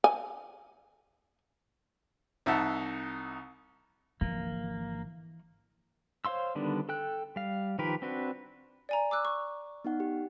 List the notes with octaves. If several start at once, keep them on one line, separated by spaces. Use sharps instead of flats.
G#5
C2 D#4 E5 F#5 A5
G#1 D3 E3 F3 A#3
C5 C#5 F5 C6 E6
D3 D#3 G3 B3 D4
A4 G5 F#6
G3 F5
D#3 F3 G4 A#4 B4
C4 D4 F#4 B4
D5 G#5 A#5
D6 E6 F#6
C#6
B3 D#4 F#5
G4